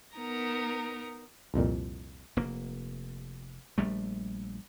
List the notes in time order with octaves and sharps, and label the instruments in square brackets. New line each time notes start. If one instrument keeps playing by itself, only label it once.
[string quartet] B3 D#4 A#4 A#5
[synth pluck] C2 F2 A#2
[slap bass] F1 A#3
A#1 G3 A3